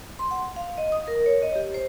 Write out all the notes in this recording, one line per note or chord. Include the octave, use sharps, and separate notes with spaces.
C6
F#5
F5
D#5
D#6
A#4
C#5
D#5
G4
C5